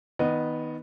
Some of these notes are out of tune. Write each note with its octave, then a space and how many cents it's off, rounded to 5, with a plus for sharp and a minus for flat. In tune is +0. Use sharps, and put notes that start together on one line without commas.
D#3 +20 B3 +0 D#5 -20